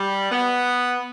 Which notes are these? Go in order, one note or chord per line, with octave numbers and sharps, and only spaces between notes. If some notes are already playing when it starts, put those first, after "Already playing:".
Already playing: G3
B3